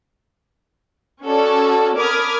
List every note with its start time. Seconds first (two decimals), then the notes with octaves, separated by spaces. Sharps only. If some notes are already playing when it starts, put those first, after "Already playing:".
1.23 C#4 F#4 A4 D5
1.96 A#4 B5 D6 D#6 F6 G#6